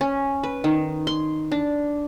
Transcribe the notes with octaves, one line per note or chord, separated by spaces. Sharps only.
C#4
B4
D#3
C6
D4